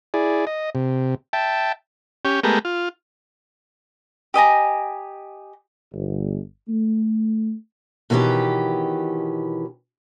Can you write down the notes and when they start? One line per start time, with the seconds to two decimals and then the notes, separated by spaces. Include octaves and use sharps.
0.14 E4 G#4 D5
0.47 D#5
0.75 C3
1.33 E5 G5 A5
2.25 C#4 G4
2.43 G#3 A3 B3 G4 A#4
2.65 F4
4.34 G4 D#5 G#5 A#5
5.93 G1
6.69 A3
8.10 B2 D#3 E3 C#4 G4